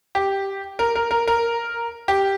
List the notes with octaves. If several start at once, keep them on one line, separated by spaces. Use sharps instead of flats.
G4
A#4
A#4
A#4
A#4
G4